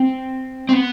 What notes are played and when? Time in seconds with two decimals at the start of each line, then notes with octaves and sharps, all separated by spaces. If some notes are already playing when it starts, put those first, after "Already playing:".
Already playing: C4
0.69 C4
0.73 B3